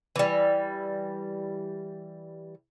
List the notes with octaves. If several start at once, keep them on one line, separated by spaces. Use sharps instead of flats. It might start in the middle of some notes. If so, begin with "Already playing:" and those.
E3 G3